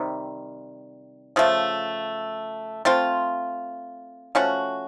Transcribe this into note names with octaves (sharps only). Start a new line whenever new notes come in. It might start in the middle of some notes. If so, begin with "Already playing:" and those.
Already playing: C3 D#3 G3
C#3 F3 A3
A3 C4 F4
F3 A3 C#4 F#4